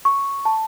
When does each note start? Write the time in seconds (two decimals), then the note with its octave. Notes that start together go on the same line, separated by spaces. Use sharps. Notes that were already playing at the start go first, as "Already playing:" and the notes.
0.05 C#6
0.45 A5